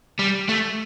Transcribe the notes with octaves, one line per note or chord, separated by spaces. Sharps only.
G3
A3